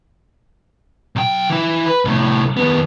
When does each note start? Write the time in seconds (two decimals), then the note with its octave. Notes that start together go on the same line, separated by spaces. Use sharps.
1.16 B1 G5
1.50 E3 E4
1.86 B4
2.05 C2 A2
2.57 D#2 B3